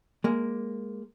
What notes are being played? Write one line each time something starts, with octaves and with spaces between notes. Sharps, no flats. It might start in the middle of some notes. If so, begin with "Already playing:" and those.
G#3 A#3